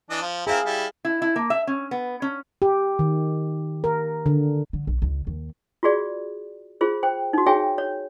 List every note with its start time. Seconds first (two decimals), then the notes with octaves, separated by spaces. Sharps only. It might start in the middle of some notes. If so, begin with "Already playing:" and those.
0.10 E3 D4 D#5
0.22 F3
0.47 C4 E4 G#4 A#4 F5
0.65 G3 E4
1.05 E4
1.22 E4
1.36 A#3
1.50 E5
1.67 C#4
1.91 B3
2.22 C#4
2.62 G4
2.99 D#3
3.84 A#4
4.26 D3
4.73 D3
4.87 B1
5.02 C#2
5.27 D#2
5.83 F4 F#4 G#4 D5
6.81 F4 G#4 C5
7.03 C5 G5
7.33 D#4 F#4
7.46 F#4 G#4 C#5 E5 G5 G#5
7.78 C#5